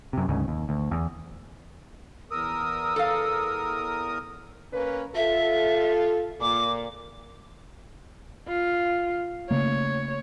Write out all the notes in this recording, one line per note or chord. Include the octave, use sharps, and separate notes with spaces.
F#2 C3
D2 G#2 C#3
D#2
D2
E2
E2 A#4 D#6 E6
A4 F5
A#3 C#4 B4
F4 A4 E5
A#2 D6
F4
C#3 A3 A#3 C#5